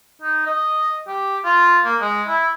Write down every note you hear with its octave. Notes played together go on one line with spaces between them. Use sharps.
D#4
D#5
G4
F4
A#3
G#3
E4